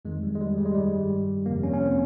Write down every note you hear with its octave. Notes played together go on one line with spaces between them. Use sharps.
F2 D#3 G#3
G3
G#3
G3
G3
G#3
G2 D#3 G3
F2 C3 F3 A#3
C#4
C#4
C4